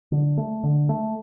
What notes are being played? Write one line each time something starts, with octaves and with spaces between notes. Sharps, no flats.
D3
A3
D3
A3